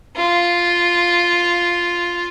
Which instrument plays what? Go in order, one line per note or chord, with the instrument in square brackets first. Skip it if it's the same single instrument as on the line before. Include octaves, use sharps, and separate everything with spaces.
[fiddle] F4